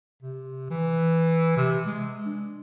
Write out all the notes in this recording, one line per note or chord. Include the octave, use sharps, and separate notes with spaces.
C3
E3
C3
G#3
D4